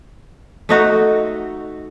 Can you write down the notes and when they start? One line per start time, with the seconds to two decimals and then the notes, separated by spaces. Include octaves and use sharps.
0.69 A3 D#4 F#4